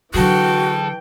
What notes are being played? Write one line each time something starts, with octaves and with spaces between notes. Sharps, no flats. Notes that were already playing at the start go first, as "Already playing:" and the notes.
D3 E3 F#3 F#4 G#4 G5 A5